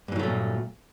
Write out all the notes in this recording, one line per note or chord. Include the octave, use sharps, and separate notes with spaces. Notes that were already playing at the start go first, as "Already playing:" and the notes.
G2 A#2 E3 F#3 A3